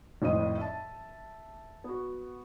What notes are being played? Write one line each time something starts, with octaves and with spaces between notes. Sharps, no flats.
G#1 F2 A2 C5 D#5 D#7
E5 A5
B3 F#4